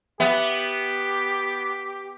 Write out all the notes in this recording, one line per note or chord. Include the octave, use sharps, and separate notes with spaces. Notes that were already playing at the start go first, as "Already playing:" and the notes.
B3 G4 E5